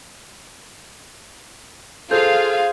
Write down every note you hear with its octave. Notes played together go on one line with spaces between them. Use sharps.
F4 G#4 A4 C5 F5 G6